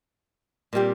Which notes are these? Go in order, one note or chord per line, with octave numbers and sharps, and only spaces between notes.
A#2 G3 C4 G4